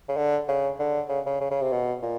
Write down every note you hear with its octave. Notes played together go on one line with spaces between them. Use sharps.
C#3
D3
C#3
D3
C#3
C#3
C#3
C#3
C3
B2
A#2